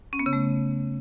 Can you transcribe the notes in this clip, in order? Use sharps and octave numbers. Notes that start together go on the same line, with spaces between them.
C#4
B3
C#3
A3